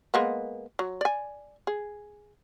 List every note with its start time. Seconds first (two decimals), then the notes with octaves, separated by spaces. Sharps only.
0.14 G#3 A#3 B3
0.79 F#3
1.01 D5 G#5
1.67 G#4